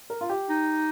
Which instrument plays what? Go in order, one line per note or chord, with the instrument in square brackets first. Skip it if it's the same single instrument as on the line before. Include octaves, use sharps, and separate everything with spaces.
[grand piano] A#4
F4
G4
[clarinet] D#4